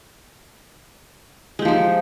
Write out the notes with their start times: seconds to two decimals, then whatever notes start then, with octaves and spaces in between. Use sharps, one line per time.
1.59 G#3
1.62 G4
1.65 F3
1.68 D#4